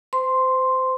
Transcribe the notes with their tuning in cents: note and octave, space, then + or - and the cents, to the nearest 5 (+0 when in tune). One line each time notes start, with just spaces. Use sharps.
C5 -25 C6 +0